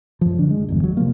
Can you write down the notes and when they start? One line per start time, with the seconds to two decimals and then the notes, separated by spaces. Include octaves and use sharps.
0.21 F#2 F3
0.39 D3 D4
0.50 G#3
0.69 G1 E2 G2
0.84 F#3
0.97 C3 F3 A#3